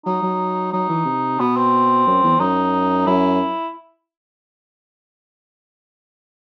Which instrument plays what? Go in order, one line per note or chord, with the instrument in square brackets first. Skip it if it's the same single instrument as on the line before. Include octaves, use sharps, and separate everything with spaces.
[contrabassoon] F#3 [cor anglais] D#4
[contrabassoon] F#3
[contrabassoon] F#3 [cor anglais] D#4
[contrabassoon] E3
C3
[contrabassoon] B2 [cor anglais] B3
[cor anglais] C4
[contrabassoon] F#2
E2
[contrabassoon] F#2 [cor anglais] D#4
[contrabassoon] F#2 [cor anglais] E4